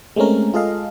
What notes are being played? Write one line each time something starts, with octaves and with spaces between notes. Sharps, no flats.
G#3 A3 C4 C#4 A#4
G#3 F4 G#4 A4 D#5 F5